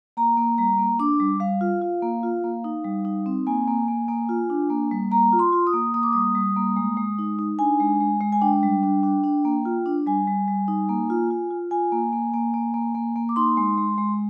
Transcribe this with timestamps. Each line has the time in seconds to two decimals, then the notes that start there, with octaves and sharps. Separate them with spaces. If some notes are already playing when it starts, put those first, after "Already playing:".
0.17 A#3 A#5
0.37 A#3
0.58 G3 A#5
0.79 A#3
0.99 D4 D6
1.20 G3
1.40 G3 F5
1.61 F4
1.81 F4
2.03 A#3
2.23 F4
2.44 A#3
2.64 D#4
2.85 G3
3.05 D#4
3.26 C4
3.47 A#3 G#5
3.68 A#3
3.88 A#3
4.08 A#3
4.29 F4
4.50 D4
4.70 A#3
4.91 G3
5.11 A#3 A#5
5.33 F4
5.39 C6
5.53 F4
5.67 D#6
5.74 A#3
5.94 A#3 D#6
6.03 D6
6.13 G3 D#6
6.35 G3
6.56 A#3
6.76 G#3
6.97 G#3
7.18 D#4
7.39 D#4
7.59 D4 G#5
7.80 G#3
8.00 G#3
8.21 G#3
8.32 G#5
8.42 D4 G5
8.63 G3
8.83 D4
9.03 D4
9.24 D4
9.45 A#3
9.65 F4
9.86 D4
10.06 G3 G#5
10.27 G3
10.48 G3
10.68 D#4
10.89 A#3
11.10 F4
11.31 F4
11.51 F4
11.71 F4 G#5
11.92 A#3
12.13 A#3
12.34 A#3
12.54 A#3
12.74 A#3
12.95 A#3
13.16 A#3
13.29 D6
13.36 D#4 C6
13.57 G#3
13.78 G#3
13.98 G#3